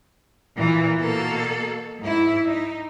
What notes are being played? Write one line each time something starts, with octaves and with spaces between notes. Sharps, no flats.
A#2 E3
B2 A#3 A4
G#2 E4
D#4